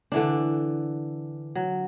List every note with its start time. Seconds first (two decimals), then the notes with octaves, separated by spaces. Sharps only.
0.12 D3 E3 D4
1.55 F#3